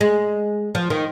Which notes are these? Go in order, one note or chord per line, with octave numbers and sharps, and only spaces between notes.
G#3
F3
D#3